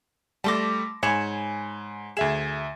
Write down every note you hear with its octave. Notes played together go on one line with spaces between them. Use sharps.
G3 A3 A5 C6 D6 A#6
G#2 C#5 G#5 B5 E7
D2 G#4 E5 E7